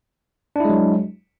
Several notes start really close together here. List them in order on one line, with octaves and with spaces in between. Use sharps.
D4 E4 G#3 F#3